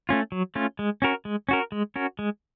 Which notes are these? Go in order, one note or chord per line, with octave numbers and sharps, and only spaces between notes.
A3 C#4 F4
F#3
A3 C#4 F4
G#3
C#4 F#4 A#4
G#3
C#4 F#4 A#4
G#3
C#4 F#4 A#4
G#3